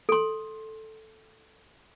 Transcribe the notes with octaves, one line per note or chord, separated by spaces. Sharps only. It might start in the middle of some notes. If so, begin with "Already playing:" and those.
A4 C6